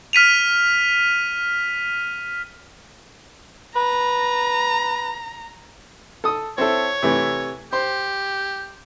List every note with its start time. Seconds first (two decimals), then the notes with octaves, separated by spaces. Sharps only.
0.13 F6 B6 D#7 F7
3.76 B4 A#5
6.24 A4 D#6
6.58 C4 E4 A4 C#5
7.02 C3 E3 A3
7.73 G4 C5